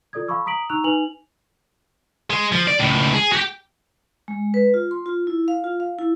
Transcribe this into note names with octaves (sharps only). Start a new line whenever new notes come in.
F4 A4 D5 D#6 G#6
F5 A5 B5 C#6 D6 E6
A#5 D#6 B6 D7 F#7
D#4 A#5 C#6 E6 F#6 F7
D#4 B4 G#5 F7 F#7
G#3
F3
D5
C#2 A2
G#4
F#4 G4
G#3
B4
F4
C6
F4
E4
F5
F4
F5
E4